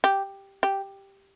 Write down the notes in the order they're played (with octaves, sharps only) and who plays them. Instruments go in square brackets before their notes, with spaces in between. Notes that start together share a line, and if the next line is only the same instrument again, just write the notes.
[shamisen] G4
G4